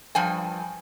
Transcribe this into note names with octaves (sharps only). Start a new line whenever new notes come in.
G2 F3 G5 G#5